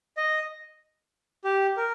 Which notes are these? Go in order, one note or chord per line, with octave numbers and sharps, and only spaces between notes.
D#5
G4
A#4